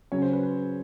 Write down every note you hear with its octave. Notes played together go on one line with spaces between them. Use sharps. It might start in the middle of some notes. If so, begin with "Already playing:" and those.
C#3 F#3 C#4 C#5
C5
B4
B4